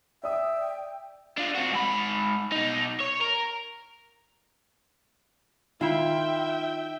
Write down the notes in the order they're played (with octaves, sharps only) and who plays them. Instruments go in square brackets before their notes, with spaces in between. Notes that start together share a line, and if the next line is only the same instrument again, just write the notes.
[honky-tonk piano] D5 D#6 [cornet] E5 [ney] G5
[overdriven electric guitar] D4 F4
C4 F#4
G#2 B5
B2 D#4
C#5
A#4
[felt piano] D#3 [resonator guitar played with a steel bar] E4 F4 [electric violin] E5 G5